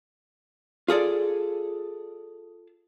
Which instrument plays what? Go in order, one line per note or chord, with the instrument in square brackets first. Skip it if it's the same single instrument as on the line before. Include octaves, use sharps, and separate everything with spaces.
[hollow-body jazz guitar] F4 G#4 A4 D5